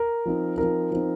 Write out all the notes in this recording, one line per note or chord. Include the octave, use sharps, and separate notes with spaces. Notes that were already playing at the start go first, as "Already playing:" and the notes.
Already playing: A#4
F3 C4 D#4
F3 C4 D#4 A#4
F3 C4 D#4